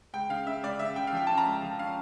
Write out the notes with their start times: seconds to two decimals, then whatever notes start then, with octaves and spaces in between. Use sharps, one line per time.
0.13 C#2 G5
0.30 C#3 F5
0.47 C#3 E5
0.63 C#2 D5
0.79 C#3 E5
0.96 C#3 G5
1.07 F5
1.12 F3 G5
1.27 C#4 A5
1.38 A#5
1.46 C#2
1.63 F3
1.79 C#4 F5